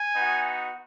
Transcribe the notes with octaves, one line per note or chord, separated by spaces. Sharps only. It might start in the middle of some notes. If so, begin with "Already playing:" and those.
Already playing: G#5
B3 D#4 F#4